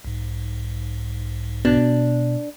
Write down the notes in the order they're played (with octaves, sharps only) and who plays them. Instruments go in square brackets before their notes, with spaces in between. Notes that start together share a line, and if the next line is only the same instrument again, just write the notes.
[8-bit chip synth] B1 G#2
[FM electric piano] B2 [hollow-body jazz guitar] D4